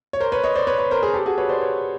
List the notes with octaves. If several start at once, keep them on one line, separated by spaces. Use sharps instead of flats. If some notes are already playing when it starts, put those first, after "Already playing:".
C#5
A#4 C5
B4 C#5
C#5 D#5
C5 D5
B4 C#5
B4 C#5
A#4 C5
G#4 A#4
G4 A4
F#4 G#4
B4 C#5
C5 D5
B4 C#5